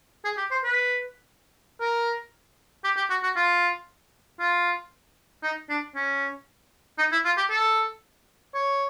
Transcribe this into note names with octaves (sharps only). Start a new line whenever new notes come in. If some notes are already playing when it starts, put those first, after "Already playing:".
G#4
G4
C5
B4
A#4
G4
G4
F#4
F#4
F4
F4
D#4
D4
C#4
D#4
E4
F4
G4
A4
C#5